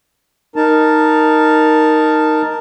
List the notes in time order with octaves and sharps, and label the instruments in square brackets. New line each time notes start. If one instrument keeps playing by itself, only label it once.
[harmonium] D#4 A#4 A5